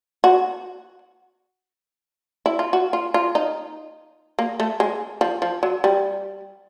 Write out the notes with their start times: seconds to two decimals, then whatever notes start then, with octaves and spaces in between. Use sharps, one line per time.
0.24 F#4
2.46 E4
2.59 F4
2.73 F#4
2.93 F4
3.14 F4
3.35 D#4
4.39 A#3
4.60 A3
4.80 G#3
5.21 F3
5.42 F3
5.63 F#3
5.84 G3